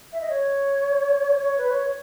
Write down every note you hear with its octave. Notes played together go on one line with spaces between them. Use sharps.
E5
D#5
C#5
C#5
B4
C#5
C#5